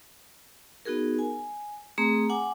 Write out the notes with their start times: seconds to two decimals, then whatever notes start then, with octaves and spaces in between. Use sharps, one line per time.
0.85 B3 D#4 F#4 G#4 A#4
1.19 G#5
1.98 A3 C4 G#4 A#5 D#6
2.30 F#5 G#5 D6